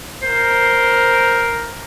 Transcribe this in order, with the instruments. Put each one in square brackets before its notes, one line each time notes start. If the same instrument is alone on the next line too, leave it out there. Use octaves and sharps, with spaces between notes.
[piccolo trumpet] A#4 [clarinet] C5